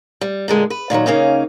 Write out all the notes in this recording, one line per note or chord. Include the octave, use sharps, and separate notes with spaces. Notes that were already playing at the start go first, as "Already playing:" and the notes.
G3
A#2 D3 G#3
B4
A#2 D#3 E3 F#3
C#3 A#3 C#4 D#4